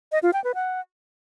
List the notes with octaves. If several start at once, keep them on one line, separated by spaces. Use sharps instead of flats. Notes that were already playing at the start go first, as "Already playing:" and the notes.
D#5
F4
G5
B4
F#5